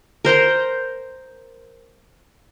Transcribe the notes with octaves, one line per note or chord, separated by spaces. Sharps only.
A#4 C5 A#5 C6